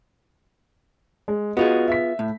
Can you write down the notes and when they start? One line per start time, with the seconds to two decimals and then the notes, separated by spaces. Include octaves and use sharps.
1.28 G#3
1.57 B3 F4 F#4 G#4 D#5
1.88 E5 B6
2.19 A2